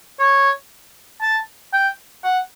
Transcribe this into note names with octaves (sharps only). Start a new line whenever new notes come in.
C#5
A5
G5
F#5